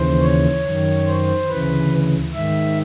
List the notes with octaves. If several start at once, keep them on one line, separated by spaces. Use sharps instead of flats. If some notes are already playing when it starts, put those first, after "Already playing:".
Already playing: D#2 C#3 E3 C5
C#5
F#2 D#3
C5
D2 C#3 E3 B4
G#2 D#3 E5